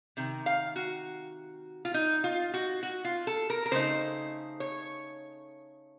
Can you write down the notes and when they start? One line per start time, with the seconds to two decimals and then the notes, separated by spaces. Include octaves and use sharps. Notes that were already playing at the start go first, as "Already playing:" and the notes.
0.17 C3 D#3
0.46 F5
0.76 F#4
1.85 F4
1.94 D#4
2.24 F4
2.54 F#4
2.83 F#4
3.05 F4
3.27 A4
3.50 A#4
3.66 A#4
3.71 C#3 A3 D#4 C5
4.60 C#5